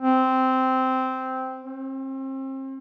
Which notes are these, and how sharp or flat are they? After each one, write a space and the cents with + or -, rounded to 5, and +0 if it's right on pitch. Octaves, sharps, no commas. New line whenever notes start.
C4 -10
C4 +35